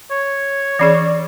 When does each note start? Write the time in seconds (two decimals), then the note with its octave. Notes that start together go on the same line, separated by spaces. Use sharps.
0.11 C#5
0.79 E3 C#4 G#4 D5